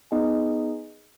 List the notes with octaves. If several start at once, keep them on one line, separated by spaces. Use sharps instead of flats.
B3 D#4 G#4 D#5 G#5